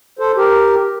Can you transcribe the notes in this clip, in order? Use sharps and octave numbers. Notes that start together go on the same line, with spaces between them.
A4 C5
G4 A#4